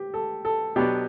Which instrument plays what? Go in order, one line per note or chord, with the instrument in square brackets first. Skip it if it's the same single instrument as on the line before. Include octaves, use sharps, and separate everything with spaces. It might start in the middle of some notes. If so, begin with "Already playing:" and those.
Already playing: [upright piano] G4
A4
A4
[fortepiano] B2 F#3 B3 D4 [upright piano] G4